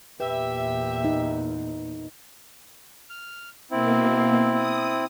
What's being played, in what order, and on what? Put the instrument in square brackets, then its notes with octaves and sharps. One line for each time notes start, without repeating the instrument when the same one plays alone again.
[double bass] E2 A#2 [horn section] G4 E5 [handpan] B4
[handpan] D#4
[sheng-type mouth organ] F6
[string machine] B2 A#3 [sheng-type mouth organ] C4 E4
[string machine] D#6